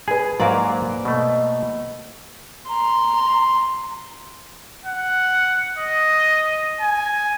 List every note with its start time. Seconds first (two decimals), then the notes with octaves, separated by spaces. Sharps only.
0.08 G#4 B4 G#5
0.40 G#2 F#3 A#3 A#4 C5 D5
1.05 B2 A3 D#5
2.69 A#5 C6
4.85 F#5
5.78 D#5
6.81 G#5